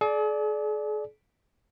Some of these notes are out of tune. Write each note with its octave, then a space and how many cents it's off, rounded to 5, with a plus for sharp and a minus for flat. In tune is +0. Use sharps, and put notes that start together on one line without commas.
G#4 +45 D5 +0